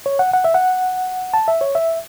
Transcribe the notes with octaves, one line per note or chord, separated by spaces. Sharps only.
C#5
F#5
F#5
E5
F#5
A5
E5
C#5
E5